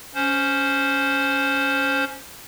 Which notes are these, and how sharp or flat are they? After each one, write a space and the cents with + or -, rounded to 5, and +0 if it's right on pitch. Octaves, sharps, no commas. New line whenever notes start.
C#4 +5 C5 +0